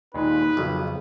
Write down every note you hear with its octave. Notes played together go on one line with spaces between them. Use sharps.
D#2 A#2 G#3 D#4 B4
B1 F2 C#3